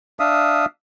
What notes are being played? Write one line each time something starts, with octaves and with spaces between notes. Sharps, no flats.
D4 E5 F5 D#6